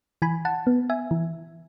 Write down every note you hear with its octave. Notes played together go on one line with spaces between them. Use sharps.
E3 G#5 B5
F#5 A5
B3
E5 G#5
E3